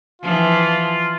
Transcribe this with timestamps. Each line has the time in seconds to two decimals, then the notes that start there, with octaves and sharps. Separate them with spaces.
0.22 E3 F3 F4